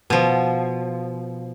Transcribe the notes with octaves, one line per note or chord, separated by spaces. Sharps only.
B2 F3